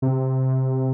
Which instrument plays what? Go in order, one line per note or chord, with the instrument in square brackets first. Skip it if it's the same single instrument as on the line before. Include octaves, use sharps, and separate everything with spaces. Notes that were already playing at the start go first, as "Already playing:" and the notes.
[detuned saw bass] C3